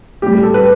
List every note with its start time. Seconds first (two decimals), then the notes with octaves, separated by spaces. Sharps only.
0.22 A2 G3 G4
0.43 A4
0.54 B4